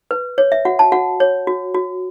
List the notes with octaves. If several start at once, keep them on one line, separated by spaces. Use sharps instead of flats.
B4
C#5
E5
F#4 F#5
A5
F#4 F#5
C#5
F#4
F#4